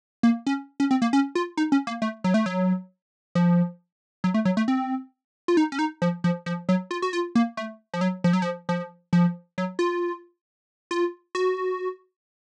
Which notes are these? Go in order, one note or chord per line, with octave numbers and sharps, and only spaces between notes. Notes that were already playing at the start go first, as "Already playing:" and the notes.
A#3
C#4
C#4
C4
A#3
C#4
F4
D#4
C#4
A#3
A3
F#3
A3
F#3
F3
F#3
A3
F#3
A3
C4
F4
D#4
C#4
D#4
F3
F3
F3
F#3
F4
F#4
F4
A#3
A3
F3
F#3
F3
F#3
F3
F3
F3
F#3
F4
F4
F#4